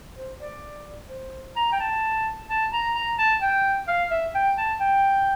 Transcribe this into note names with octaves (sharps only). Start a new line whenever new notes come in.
C5
D5
C5
A#5
G5
A5
A5
A#5
A#5
A5
G5
F5
E5
G5
A5
G5